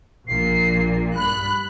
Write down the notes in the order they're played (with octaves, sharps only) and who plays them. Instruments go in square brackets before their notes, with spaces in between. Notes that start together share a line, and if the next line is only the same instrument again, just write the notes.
[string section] A#1 A#2 [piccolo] C7
[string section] G2 F#6 [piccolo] B5